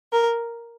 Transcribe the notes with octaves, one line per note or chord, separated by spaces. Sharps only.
A#4